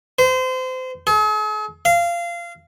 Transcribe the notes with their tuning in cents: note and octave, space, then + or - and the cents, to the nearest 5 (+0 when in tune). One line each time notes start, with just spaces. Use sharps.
C5 -30
G#4 +45
F5 -20